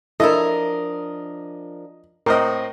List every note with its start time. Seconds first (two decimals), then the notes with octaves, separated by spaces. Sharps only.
0.20 F3 D4 E4 A4 A#4 D#5
2.26 A2 C4 A#4 D#5